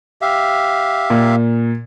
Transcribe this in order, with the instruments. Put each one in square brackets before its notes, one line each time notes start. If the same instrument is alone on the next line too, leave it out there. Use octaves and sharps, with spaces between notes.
[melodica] G4 E5 F5
[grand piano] A#2